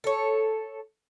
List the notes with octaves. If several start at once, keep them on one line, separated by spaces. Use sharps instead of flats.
A4 C#5